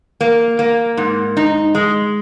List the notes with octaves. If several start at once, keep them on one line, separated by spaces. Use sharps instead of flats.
A#3
A#3
G#2
D#4
G#3